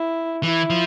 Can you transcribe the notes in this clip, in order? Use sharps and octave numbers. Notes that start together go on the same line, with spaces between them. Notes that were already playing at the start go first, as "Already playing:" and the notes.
Already playing: E4
E3 E4
F3